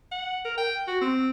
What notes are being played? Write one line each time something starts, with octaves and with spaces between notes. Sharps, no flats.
F#5
A#4
G5
F#4
C4